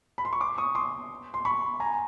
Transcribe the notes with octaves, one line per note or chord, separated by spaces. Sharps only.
B5
C6
C#6
C6 D6
C#6 D#6
C6 D6
C6
B5 C#6
G#5 A#5